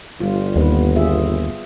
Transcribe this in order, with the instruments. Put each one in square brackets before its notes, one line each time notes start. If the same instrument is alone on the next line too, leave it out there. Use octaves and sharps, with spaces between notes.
[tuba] G1 [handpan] G3 F4
[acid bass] D#2 [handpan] B3 B4
[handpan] F4 G#4 E5